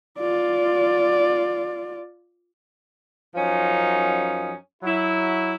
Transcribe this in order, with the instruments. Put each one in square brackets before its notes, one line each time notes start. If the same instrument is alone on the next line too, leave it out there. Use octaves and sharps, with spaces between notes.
[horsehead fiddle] F4 D5
[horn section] F#2 F3 C#4 D#4
F#3 E4